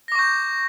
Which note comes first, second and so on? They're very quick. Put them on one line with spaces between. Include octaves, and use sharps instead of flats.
A#6 D6 C#6 G6